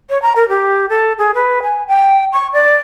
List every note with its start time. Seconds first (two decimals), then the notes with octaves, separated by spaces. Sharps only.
0.10 C#5
0.22 A#5
0.36 A#4
0.49 G4
0.89 A4
1.19 G#4
1.35 B4
1.63 G#5
1.88 G5
2.33 C#6
2.53 D5